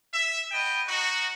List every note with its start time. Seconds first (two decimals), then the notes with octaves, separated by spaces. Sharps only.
0.12 E5
0.52 B3 D#5 G5
0.87 D#4 F#4